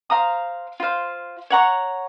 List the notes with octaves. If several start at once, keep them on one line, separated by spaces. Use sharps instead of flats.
C5 F5 A#5 D#6
F4 C5 F5
C#5 F#5 A#5 C#6